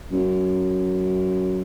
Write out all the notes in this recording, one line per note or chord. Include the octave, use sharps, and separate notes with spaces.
F#2